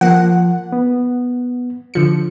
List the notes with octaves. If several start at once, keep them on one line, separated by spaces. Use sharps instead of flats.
F3 A#3 F#5
B3
D3 F3 C#7